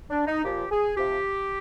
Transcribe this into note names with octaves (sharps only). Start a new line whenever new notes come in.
D4
D#4
A#2 F3 G4
G#4
C3 F3 G4